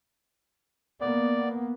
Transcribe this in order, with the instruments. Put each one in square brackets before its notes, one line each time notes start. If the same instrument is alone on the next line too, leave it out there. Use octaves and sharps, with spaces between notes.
[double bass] A#3 [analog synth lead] B3 [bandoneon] D5